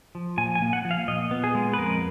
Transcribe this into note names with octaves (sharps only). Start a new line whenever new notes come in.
F3
A#2 G#5
G#5
A#3
F#5
F3
F5
A#2 D#5
B3
G#4
G#3
B4
F2 A#4